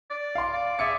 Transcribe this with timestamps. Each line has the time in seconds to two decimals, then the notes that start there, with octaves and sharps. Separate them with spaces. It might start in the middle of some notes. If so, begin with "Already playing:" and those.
0.10 D5
0.35 F5 C6
0.53 D5
0.79 G#4 E5 D6 C#7